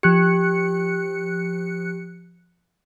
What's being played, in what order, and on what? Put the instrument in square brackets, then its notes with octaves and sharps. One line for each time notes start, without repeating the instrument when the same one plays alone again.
[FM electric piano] F3 F#6 C#7 [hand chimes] G4